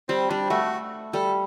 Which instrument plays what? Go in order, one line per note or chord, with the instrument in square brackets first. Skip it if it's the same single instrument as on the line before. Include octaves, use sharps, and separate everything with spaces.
[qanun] G3 [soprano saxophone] C4
[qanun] G3 [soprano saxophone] D4
[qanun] A3 [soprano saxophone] F#4
[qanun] G3 [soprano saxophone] A4